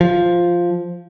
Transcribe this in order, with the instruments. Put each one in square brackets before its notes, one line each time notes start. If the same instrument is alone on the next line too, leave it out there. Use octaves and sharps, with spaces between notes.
[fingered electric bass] F3